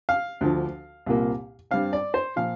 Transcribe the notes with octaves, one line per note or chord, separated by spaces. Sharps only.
F5
D2 D3 F3
C2 A#2 A#3
G2 G3 C4 F5
D5
C5
A#2 F3 F5